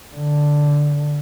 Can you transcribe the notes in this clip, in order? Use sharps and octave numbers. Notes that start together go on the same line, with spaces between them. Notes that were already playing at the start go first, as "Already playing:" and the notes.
D3